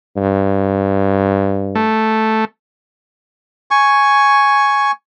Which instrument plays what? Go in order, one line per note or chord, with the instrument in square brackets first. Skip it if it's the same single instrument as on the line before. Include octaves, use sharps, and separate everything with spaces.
[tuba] G2
[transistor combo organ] A3
[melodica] G#5 C#6